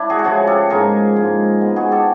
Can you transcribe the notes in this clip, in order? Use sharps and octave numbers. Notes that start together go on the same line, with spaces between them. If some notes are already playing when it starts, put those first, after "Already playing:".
Already playing: D4 E4
F#4 G#4
A4
C#3 F3 A3 F#4 G#4
G4 A4
G#2 F3 A#3 G#4 A#4
G#2 F3 A#3
B2 G#3 B3
F#4 G#4
G4 A4